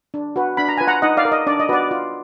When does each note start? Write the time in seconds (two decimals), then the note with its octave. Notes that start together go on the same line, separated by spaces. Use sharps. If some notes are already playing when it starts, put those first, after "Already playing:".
0.14 D4
0.36 F#4 B4
0.57 D4 B5
0.68 A#5
0.77 F4 B4 G#5
0.87 F#5 A#5
1.02 D#4 D#5 F#5
1.17 D5 F5
1.25 A#4
1.32 D#5
1.47 D4 D5
1.60 D#5
1.69 F#4 B4 D5
1.91 F4